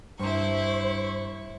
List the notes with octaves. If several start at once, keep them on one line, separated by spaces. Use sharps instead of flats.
G2 E4 C5 C#6